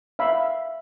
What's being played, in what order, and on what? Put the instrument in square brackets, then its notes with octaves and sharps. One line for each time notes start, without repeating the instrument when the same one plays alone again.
[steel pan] E5 F5 B5